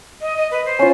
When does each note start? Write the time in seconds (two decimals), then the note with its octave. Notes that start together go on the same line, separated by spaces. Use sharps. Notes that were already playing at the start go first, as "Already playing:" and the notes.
0.21 D#5
0.37 D#5
0.51 B4
0.66 C5
0.79 C#4 F4